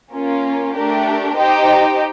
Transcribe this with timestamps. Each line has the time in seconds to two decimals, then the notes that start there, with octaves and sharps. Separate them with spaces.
0.14 A#3 C#4 F4
0.76 A3 D4 G4 A#4
1.36 D#4 G4 C5 D#5 G5